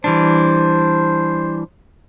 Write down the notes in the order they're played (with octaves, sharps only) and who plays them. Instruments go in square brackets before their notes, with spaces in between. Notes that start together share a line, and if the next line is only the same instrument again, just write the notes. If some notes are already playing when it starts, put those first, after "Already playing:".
[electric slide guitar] E3 G3 D4 [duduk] C5